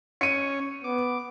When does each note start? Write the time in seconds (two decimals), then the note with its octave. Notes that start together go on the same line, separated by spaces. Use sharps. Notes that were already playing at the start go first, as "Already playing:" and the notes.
0.21 C#4 C#5 C#7 D#7
0.84 B3 D6